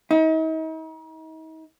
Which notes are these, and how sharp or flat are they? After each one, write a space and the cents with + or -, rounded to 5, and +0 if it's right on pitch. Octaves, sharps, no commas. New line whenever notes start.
D#4 +40